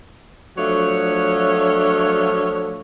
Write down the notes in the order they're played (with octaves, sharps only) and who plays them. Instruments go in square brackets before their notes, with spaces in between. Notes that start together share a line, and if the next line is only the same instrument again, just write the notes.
[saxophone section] F3 F#3 A3 D4 C#5